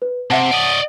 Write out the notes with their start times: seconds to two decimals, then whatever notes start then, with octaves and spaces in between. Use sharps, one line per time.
0.02 B4
0.30 C3 E5 F#5 A5
0.51 D5 D#5